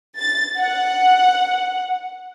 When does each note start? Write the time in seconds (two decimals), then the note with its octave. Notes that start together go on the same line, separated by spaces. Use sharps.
0.18 A6
0.58 F#5